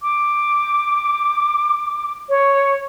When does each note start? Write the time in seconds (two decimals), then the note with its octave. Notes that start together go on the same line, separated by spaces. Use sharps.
0.01 D6
2.29 C#5